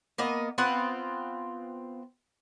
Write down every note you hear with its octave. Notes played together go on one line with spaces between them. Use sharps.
A#3 B3 D#5
B3 C4 F4 F#5